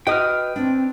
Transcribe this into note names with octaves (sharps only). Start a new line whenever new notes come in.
F#4 B4 D#5 G5 D#6 F6
C4 D4